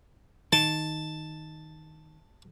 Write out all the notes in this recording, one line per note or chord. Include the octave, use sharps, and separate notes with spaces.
D#3 A5